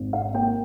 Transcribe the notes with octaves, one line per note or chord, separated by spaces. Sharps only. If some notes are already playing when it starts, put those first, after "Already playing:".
Already playing: G#1
F5
A#3 G5